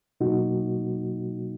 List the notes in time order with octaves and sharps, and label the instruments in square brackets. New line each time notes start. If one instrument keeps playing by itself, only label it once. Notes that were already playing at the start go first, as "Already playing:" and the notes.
[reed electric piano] B2 F#3 A#3 D#4 F#4